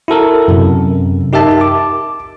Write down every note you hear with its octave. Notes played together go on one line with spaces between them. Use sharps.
E4 F#4 A4 A#4
F#2 C3
D#4 G4 A#4 E5 A5
D6